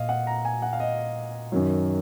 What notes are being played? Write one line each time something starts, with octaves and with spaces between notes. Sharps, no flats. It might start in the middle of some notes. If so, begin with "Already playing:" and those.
Already playing: A#2 D#5 F5
F#5
A#5
G#5
F#5
F5
D#5
F#2 D#3 F#3